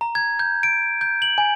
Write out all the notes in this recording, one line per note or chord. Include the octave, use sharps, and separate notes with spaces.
A#5
G#6
G6
D7
G6
F#7
G#5